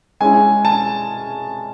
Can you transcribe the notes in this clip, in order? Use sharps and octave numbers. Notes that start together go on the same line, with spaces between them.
G#3 C#4 E4 G#5
A5